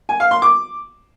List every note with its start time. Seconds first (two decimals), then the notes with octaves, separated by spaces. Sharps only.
0.09 G#5
0.20 F5
0.31 C6
0.42 D6